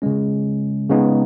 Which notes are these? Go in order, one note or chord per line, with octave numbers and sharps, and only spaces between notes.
C#3 G#3 C#4
C#3 G#3 B3 D#4